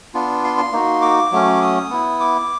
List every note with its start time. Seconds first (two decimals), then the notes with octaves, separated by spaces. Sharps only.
0.14 B3 D4 F4
0.44 C6
0.58 C6
0.72 A#3 D#4 F#4
1.02 D6
1.32 F#3 A3 C#4
1.62 D#6
1.90 B3 E4
2.20 D6